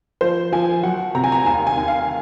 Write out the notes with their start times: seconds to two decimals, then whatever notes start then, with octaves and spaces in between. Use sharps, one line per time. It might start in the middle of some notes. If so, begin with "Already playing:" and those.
0.21 F3 C5
0.52 F3 G#5
0.83 F#3 F#5
1.15 C3 A#5
1.24 G#5
1.32 A#5
1.46 D#2 G#5
1.67 G#5
1.77 D#2
1.88 F5